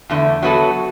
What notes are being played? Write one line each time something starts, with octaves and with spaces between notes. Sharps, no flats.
E2 D3 A3
F#3 B3 F#4 A4